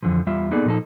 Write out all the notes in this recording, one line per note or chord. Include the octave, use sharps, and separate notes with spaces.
F2 A#2 D3 E3 F3
E2 G3 F4 E5
A#3 B3 D#4 G#4 A4 D5
A#2 F3 D#4 A4